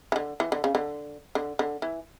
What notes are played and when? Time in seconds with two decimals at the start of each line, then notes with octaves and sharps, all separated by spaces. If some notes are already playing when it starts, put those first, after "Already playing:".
0.12 E3
0.16 D3
0.40 E3
0.52 D3
0.64 C#3
0.75 D3
1.35 D3
1.59 D3
1.82 E3